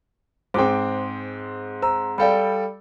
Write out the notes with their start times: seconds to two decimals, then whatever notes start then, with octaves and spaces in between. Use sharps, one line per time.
0.54 G#2 G#3 C4 C5 G5 D6
1.82 C5 A#5 E6
2.18 G3 A4 D5 F5 G5 B5